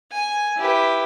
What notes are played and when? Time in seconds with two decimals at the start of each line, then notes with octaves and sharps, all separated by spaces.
0.12 G#5
0.58 E4 G4 B4